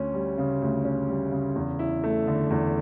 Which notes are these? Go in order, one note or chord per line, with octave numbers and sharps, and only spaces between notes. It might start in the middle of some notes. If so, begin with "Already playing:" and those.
Already playing: D2 C#4
G3
C#3
D2
C#4
G3
C#3
E2
E4
A3
D3
E2